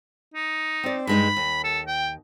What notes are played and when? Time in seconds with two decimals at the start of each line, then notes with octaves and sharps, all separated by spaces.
0.34 D#4
0.83 C4 D5
1.07 G2 G#3 D#4 B5
1.37 D#2
1.64 A4
1.88 G5